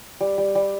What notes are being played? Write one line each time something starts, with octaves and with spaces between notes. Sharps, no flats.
G3
G3
G3